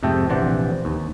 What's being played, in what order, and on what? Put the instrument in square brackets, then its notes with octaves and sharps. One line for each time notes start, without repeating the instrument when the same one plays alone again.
[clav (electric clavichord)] F2 G#2 C3 A3 A4 G5
A#1 C3 E3 C5 D5 F#5
D#2